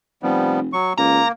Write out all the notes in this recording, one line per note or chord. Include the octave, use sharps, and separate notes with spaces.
F1 F3 G3 B3
F#3 C#6
C#2 A#3 A#5